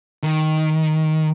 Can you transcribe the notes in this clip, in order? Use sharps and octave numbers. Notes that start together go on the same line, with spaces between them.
D#3